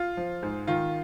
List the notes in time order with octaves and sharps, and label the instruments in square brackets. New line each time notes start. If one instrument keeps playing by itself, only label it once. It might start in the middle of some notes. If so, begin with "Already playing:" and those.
Already playing: [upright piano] F4
F3
G#2
D#3 F4